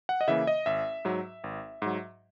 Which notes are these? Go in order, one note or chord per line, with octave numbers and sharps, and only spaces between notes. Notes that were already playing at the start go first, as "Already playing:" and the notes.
F#5
D#5
C#3 E3 A#3 E5
D#5
G#1 E5
G#2 F#3
G#1
G#2 F#3